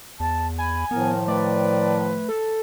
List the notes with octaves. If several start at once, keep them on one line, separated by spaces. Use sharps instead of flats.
E2 A5
G#5 B5
A2 D#3 F3 B3 A#4
A3 B4 D5
A4